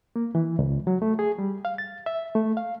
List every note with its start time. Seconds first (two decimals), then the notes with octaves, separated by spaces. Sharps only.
0.16 A#3
0.35 E3
0.59 C#2
0.87 F#3
1.02 A3
1.19 G#4
1.39 G3
1.65 F5
1.78 A6
2.06 E5
2.35 A3
2.57 F5